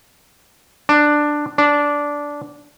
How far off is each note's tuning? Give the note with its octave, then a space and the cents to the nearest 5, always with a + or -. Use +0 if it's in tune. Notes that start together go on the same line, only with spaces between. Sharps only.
D4 +10
D4 -10